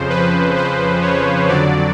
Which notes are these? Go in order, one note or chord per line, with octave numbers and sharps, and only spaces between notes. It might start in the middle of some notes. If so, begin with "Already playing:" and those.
Already playing: F2 C#3 F3 C5
B4
C5
C#5
F2 D3 F#3 D5